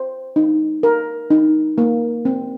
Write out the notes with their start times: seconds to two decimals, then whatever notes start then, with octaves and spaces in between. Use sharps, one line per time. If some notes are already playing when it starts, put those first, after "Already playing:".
Already playing: C5
0.36 D#4
0.83 A#4
1.30 D#4
1.78 A#3
2.25 C4